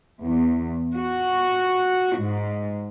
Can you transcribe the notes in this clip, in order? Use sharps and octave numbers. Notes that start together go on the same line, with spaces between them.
E2
F#4
G#2